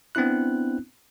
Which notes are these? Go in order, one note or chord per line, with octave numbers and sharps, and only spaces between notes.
B3 C4 D4 E4 F#6